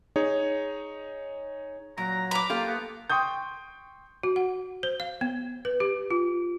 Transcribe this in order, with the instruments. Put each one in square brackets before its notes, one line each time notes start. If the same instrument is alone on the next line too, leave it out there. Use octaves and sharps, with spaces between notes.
[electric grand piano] D#4 G#4 C#5
[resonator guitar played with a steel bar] A#2 [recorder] F#3 [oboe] A#5
[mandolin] A#5 D6 [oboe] B5
[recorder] A#3 [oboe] F4 [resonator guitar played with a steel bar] G4 A4 F5
[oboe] B3
[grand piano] G5 C6 C#6 D#6 G6
[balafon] F#4
F#5
C5
F5
B3
B4
G4
F4